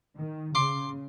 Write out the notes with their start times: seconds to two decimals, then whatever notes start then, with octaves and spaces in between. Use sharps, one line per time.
0.18 D#3
0.55 C#3 C6 D6